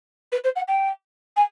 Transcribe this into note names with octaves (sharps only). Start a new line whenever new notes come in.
B4
C5
F#5
G5
G#5